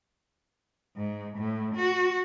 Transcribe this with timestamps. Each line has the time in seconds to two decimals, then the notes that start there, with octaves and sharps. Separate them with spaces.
0.96 G#2
1.38 A2
1.75 F#4